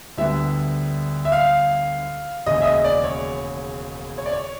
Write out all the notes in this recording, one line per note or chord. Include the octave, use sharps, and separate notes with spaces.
D2 D3 G3 B3 E5
E5
F5
E1 D#2 C#3 D#5
E5
D#5
D5
C#5
C#5
D5
C#5